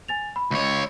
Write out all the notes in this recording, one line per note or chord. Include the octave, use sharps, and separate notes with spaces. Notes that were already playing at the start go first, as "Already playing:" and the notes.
G#5 A6 F7
B5
C#2 C#5